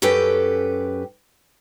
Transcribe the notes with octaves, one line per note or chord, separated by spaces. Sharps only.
F#2 C#4 G4 A4 B4 G5